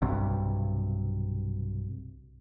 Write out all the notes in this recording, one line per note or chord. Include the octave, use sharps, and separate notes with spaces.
B1 G2 C3